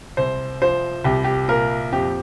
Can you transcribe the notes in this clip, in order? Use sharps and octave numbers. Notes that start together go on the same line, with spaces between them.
C2 C5
F3 C5
C2 G4
G4
A#2 A#4
F2 G4